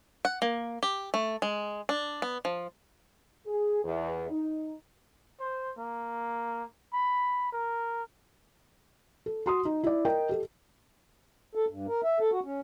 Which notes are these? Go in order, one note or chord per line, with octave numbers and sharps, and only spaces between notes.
F#5
A#3
G4
A3
G#3
D4
B3
F3
G#4
E2
D#4
C5
A#3
B5
A#4
A4
F#4 C6 D#6
D#4
E4 D5
A#4 D#5 G5
G4 A4
A4
G2
A#4
E5
A4
F#4
C#4